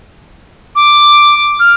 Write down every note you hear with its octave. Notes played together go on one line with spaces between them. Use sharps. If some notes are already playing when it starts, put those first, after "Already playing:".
D6
F6